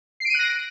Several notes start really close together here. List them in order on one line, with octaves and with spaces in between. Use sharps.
C7 D7 D#7 F#6 A#6